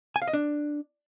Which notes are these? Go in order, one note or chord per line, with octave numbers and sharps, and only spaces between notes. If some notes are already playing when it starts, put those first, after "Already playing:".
G#5
F5
D#5
D4